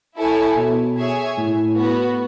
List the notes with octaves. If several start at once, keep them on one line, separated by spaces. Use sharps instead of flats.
E4 A4 C#5 G#5
B2
G#4 C#5 E5 G#5
A2
B3 F#4 B4